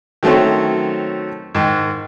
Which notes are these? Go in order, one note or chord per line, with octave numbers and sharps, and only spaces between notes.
D#3 F#3 A3 C4 C#4
G#2 D#3